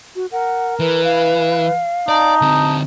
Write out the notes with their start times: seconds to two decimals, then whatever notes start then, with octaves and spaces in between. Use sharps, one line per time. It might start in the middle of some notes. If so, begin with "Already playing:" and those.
0.16 F#4
0.32 A#4 F#5
0.80 E3 B4
1.04 F5
2.09 D#4 D5 A5
2.41 D3 C4